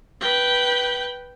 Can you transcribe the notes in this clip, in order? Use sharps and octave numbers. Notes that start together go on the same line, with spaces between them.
B4 G5